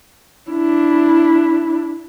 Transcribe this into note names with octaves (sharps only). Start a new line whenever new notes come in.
D4 E4